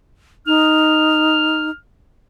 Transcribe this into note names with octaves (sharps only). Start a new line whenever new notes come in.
D#4 F6